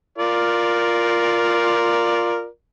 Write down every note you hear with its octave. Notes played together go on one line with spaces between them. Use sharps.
F4 A#4 D5